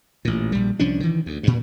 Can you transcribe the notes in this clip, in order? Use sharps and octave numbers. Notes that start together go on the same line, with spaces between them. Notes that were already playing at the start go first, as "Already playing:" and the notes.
A1 A#2
A#1 G3
C2 F3 C#4 D4
D#3 E3
D2
G2 A#2